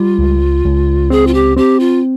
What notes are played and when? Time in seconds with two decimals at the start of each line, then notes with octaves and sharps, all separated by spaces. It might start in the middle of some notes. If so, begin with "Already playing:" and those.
Already playing: G3 F4
0.18 C#2
0.65 C#2
1.10 C4 G#4
1.27 F4
1.34 G4
1.56 C4 G4
1.80 F4